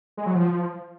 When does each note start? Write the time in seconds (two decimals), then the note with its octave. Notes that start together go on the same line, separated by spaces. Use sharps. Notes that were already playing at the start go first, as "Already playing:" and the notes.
0.17 G#3
0.26 F#3
0.35 F3